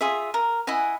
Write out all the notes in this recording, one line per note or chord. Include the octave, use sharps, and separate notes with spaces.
F4 G#4 E5
A#4
E4 D#5 F#5 G#5